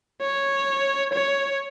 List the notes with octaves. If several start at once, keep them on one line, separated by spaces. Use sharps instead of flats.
C#5
C#5